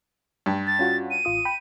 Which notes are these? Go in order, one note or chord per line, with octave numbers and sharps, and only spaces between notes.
G2
A6
C#4 F4 F#4
D#7
A1 F4 D#6
G5 B5